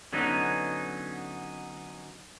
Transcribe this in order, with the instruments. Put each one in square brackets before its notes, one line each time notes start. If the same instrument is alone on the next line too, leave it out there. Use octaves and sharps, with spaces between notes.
[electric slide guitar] D3 F#3 B3 C#4 D#4